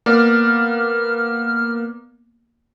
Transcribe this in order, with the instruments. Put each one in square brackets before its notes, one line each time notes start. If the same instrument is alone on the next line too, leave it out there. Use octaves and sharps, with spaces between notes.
[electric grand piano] A#3 B3 D5 [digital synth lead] F6